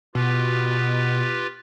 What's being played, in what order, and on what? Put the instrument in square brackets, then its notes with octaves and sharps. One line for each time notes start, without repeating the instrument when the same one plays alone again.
[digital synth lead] B2 [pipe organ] F4 G4 B4